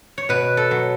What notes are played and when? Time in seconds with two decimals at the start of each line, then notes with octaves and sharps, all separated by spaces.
0.18 C#5
0.29 B2 B4
0.57 A4
0.71 F#3